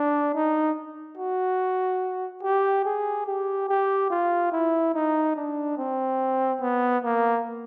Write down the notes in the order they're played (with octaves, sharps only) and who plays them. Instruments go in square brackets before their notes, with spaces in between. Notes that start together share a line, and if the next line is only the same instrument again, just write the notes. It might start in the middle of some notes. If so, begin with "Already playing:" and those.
Already playing: [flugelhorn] D4
D#4
F#4
G4
G#4
G4
G4
F4
E4
D#4
D4
C4
B3
A#3